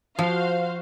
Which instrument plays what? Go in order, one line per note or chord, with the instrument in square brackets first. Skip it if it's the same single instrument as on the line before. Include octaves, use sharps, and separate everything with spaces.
[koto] F3 [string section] F#4 C5 F5